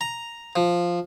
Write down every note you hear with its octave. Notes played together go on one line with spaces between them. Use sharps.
A#5
F3